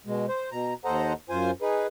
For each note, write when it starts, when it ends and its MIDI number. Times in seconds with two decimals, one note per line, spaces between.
0.06 0.26 47
0.06 0.26 56
0.28 0.50 72
0.52 0.74 47
0.52 0.74 82
0.85 1.13 39
0.85 1.13 69
0.85 1.13 72
0.85 1.13 75
0.85 1.13 78
0.85 1.13 82
1.30 1.51 42
1.30 1.51 65
1.30 1.51 72
1.30 1.51 80
1.62 1.87 63
1.62 1.87 68
1.62 1.87 71